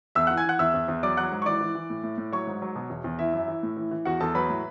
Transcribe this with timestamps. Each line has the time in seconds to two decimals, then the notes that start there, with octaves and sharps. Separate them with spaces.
0.15 E2 E5 E6
0.27 E3 F#5 F#6
0.37 G#5 G#6
0.44 E3 F#5 F#6
0.59 E2 E5 E6
0.74 E2
0.88 E2
1.03 F#3 D5 D6
1.17 F#3 F#5 F#6
1.32 G#2
1.42 C#6
1.46 E3 D5 D6
1.61 E3
1.75 E3
1.90 A2
2.03 A2
2.18 A2
2.32 F#3 C#5 C#6
2.47 G#2
2.62 F#3
2.75 B2
2.90 E2
3.04 E2
3.19 E3 E4 E5
3.33 F#2
3.48 E3
3.63 A2
3.77 E3
3.91 E3
4.05 E2 F#4 F#5
4.20 E2 A4 A5
4.35 F#3 B4 B5
4.50 A2